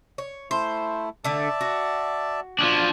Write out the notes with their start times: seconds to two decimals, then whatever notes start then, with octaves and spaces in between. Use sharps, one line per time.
0.18 C#5
0.51 A3 E4 C5
1.24 D3 A3 D5 E5 A5
1.61 F#4
2.59 F3 D4